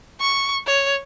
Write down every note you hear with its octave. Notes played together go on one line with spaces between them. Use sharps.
C#6
C#5